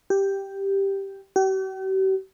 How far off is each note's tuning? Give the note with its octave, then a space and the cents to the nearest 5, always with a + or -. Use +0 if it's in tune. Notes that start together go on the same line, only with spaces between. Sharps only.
G4 +0
G4 -45